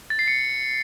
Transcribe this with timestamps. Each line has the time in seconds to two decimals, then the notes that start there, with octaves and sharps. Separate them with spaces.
0.10 A6
0.19 C7
0.28 C#7